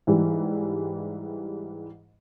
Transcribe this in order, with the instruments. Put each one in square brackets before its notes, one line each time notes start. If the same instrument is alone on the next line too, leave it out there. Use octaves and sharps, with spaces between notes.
[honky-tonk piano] G#2 E3 G3